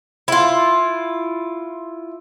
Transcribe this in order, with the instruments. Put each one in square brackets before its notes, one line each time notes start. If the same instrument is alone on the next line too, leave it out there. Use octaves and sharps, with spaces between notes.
[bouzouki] E4 F4